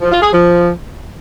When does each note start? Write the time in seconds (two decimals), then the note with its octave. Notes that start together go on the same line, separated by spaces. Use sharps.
0.01 F3
0.12 F4
0.22 G#4
0.33 F3